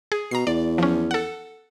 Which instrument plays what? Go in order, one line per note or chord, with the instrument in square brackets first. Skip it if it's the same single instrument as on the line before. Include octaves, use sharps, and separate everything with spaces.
[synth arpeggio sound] G#4
[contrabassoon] B2 [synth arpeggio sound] A#5 C7
[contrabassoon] E2 [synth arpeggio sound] D5
[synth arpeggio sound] F3 C#4
A4 F#5